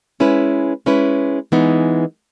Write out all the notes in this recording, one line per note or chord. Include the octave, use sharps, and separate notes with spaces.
G#3 C#4 E4 B4
G#3 C#4 E4 B4
E3 G#3 B3 D#4